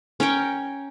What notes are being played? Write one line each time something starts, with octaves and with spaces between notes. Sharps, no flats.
C#4 A#4 C#5 G5